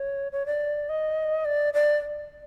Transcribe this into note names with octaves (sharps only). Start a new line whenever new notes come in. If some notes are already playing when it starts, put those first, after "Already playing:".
Already playing: C#5
C#5
D5
D#5
D5
D5